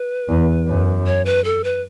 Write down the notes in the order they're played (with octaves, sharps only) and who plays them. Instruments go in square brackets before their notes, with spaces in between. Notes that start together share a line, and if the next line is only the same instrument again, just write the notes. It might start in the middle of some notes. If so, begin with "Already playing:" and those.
Already playing: [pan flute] B4
[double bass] E2
F#2
[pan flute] C#5
B4
A4
B4